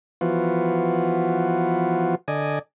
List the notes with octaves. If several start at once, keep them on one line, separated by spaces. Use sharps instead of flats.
E3 F3 B3 F4 F#4
D3 D5 D#5 G#5